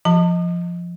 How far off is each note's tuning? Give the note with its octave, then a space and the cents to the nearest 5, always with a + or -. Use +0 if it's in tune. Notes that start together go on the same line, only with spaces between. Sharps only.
F3 -5 A5 +40